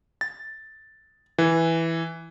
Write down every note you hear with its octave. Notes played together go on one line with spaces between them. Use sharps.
A6
E3